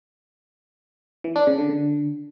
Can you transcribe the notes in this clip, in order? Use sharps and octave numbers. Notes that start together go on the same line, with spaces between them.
E3
D4
C#3
D3
D3